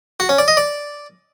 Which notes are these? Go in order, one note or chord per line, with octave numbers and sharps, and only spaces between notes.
F#4
C#4
D5
D#5
D5